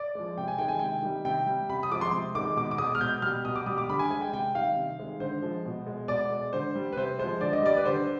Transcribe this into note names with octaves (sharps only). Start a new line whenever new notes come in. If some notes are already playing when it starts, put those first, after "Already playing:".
Already playing: D5
F3 G#3
C3 G5
G#5
D#3 G#3 G5
G#5
C3 G5
D#3 G3
C3 G5
G3
C3 B5
D#6
F3 G#3 D6
C6
C3
D#3 G#3 D6
B2 D6
D6
G#3 D#6
F6
B2 G6
G3 F6
B2 D#6
D6
G3 D#6
D6
D3 B5
G#5
G#3 G#5
G5
C3 G5
D#3 G3 F5
C3
D#3 G#3
D3 C5
F3 G#3
B2
G#3
B2 D5
G#3
D3 C5
G3
B4
C3 C5
F3 G#3 C5
D3 D5
D#5
G3 D5
B4
D3 C5